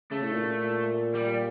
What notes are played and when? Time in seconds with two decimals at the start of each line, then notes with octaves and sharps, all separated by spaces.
0.11 C#3 A3
0.23 A2
0.32 A#2
1.14 G3